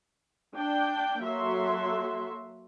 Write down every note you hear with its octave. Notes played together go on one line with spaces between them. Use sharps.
D4 G5
F#3 A#3 F#4 A4 E5 C6